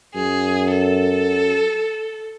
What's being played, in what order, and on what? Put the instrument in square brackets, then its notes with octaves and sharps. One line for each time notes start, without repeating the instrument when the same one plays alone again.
[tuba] F#2 [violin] G#4
[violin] A4